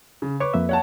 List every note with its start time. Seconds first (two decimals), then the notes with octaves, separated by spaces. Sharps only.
0.22 C#3
0.40 B4 C#5 C#6 D6
0.54 F2 A#3 E5
0.69 C#5 F#5 A5